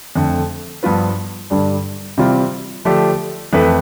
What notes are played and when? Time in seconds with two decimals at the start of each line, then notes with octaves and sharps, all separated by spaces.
0.16 F2 D3 A3
0.83 G2 F3 B3 F4 B4
1.50 G2 D3 G3 D4
2.18 C3 E3 G3 C4 F4
2.85 D3 F3 A3 D4 G4
3.53 F2 E3 A3 E4 B4